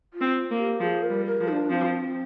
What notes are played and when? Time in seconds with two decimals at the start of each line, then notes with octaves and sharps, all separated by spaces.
0.14 F4
0.21 C4
0.51 A#3
0.58 G4
0.80 F3 G#4
1.03 A#4
1.10 G3
1.26 A#4
1.41 F3
1.48 D#4
1.53 D4
1.70 F3 C4